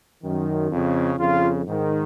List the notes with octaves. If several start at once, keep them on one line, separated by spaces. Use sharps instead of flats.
F#2 D#3
F2 C#3
F2 C#3 F4
G#2 D#3